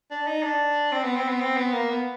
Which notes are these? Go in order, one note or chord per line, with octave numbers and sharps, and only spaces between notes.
D4
D#4
D4
C4
B3
C4
B3
C4
B3
A#3
B3